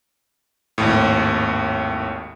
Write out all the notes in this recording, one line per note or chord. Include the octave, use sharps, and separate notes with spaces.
G#1 D#2 A2